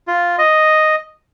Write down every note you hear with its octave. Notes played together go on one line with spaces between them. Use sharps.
F4
D#5